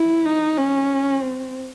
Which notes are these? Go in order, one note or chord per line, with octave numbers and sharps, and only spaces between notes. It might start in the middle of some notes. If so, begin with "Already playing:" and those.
Already playing: E4
D#4
C#4
C4